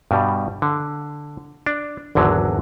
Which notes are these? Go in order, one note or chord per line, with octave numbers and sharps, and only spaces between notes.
G2 B2 G3
D3
D4
G#1 E2 D3 F#3